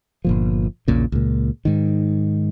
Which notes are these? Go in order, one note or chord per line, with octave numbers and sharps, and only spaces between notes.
G1 A#2 F3
A#1 E2 A#2 C#3
C#2 A#2
G#2 D#3